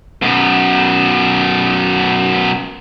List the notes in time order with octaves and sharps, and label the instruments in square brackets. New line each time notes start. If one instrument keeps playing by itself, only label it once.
[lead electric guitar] F#2 B2